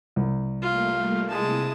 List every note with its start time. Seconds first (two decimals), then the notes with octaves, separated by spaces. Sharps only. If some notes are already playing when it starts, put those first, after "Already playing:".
0.16 C2
0.62 G3 A3 A#3 F4
1.30 C3 G#3 E4 A5 D#6